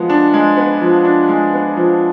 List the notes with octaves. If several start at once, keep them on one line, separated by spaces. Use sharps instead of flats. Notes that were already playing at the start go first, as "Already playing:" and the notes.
Already playing: F3 G#3 B3
D4
G#3
B3
F3
D4
G#3
B3
F3